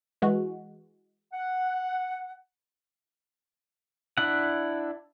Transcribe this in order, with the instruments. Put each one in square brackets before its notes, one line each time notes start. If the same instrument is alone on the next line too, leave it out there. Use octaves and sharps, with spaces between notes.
[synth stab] E3 G#3 F#4
[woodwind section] F#5
[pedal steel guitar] D4 E4 F#5